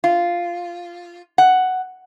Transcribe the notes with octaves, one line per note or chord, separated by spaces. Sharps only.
F4
F#5